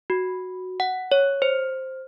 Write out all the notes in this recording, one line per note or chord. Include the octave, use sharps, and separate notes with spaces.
F#4
F#5
C#5
C5